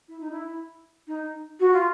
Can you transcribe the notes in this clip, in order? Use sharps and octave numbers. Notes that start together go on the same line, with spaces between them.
E4
D#4
E4
D#4
F#4
F4